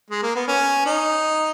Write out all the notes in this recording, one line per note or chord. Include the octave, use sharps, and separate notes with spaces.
G#3
A#3
B3
C#4
D#4